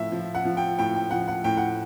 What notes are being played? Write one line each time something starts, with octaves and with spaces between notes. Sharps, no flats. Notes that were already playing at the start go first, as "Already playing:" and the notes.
Already playing: A2 F3 E5
F3
F#5
F3
G5
A2 G5
G5
F3 F#5
F#5
A2 G5
F#5